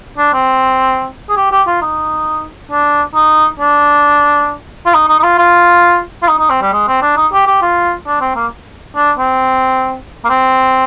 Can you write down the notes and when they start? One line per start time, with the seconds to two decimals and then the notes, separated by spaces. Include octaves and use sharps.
0.18 D4
0.33 C4
1.29 G#4
1.37 G4
1.51 G4
1.67 F4
1.82 D#4
2.71 D4
3.15 D#4
3.60 D4
4.86 F4
4.94 D#4
5.08 D#4
5.19 D#4
5.23 F4
5.38 F4
6.23 F4
6.28 D#4
6.39 D#4
6.50 C4
6.62 G3
6.73 G#3
6.88 C4
7.02 D4
7.17 D#4
7.33 G4
7.47 G4
7.62 F4
8.06 D4
8.21 C4
8.36 A#3
8.96 D4
9.18 C4
10.25 A#3
10.29 C4